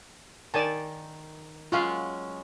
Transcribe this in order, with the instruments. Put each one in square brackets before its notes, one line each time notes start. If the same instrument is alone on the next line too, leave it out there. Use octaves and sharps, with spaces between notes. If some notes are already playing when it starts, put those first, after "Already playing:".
[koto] D#3 [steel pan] D5 G#5 A5
[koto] F#3 G#3 C#4 [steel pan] F4 F5